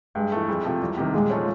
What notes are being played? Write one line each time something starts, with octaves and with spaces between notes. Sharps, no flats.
G2 G#3
E3 A3
F2 G#3
C3 F3 A3
E2 G3
C3 D#3
A#2 G#3
F3 A3 C#4